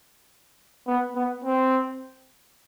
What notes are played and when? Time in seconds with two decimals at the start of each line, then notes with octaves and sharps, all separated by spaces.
0.87 B3
1.16 B3
1.44 C4